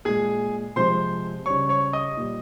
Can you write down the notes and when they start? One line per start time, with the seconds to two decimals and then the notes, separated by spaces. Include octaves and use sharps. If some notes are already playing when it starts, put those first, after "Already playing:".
0.05 A#2 G#3 G#4 G#5
0.76 C3 F3 G#3 C5 C6
1.46 C#3 G3 C#5 C#6
1.69 C#5 C#6
1.93 D#5 D#6
2.17 A#2 G3